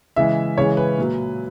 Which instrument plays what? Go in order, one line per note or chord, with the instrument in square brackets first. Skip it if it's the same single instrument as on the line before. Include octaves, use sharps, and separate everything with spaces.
[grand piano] C#3 E3 G#3 E5
C#3 E3 G#3 C#5
B4
A#2 F#3